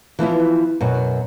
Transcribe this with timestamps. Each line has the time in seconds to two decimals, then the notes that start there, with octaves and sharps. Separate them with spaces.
0.19 E3 F3 B3 E4
0.81 F#2 B2